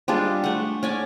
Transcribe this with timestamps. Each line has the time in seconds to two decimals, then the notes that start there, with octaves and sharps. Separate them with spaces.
0.08 G3 G#3 D4 F4
0.44 A3 F#5
0.83 C#4 D5 G#5